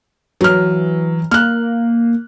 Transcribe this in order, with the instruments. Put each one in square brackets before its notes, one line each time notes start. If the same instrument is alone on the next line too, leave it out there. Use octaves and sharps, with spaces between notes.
[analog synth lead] E3 [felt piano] F#3 F6
[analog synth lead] A#3 [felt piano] F6 F#6